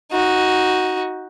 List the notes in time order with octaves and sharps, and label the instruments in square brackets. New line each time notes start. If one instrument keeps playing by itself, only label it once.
[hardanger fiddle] D#4 F#4